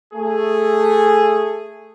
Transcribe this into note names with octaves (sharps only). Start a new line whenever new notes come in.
A3 G#4